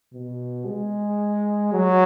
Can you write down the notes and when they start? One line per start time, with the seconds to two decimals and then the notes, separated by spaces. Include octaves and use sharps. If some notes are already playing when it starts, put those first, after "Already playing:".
0.14 B2
0.66 G#3
1.73 F#3